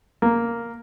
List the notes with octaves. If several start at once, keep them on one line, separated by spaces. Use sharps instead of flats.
A#3